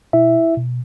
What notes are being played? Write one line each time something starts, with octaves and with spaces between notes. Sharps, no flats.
B2 E4 E5
B2